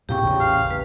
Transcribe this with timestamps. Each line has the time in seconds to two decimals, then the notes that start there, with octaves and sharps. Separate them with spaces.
0.09 F2 A#2 C#3 G4 G5 C#6
0.22 A1 E2 C#3
0.40 F5
0.71 A1 B4